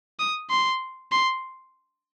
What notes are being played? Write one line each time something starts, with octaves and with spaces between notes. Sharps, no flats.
D#6
C6
C6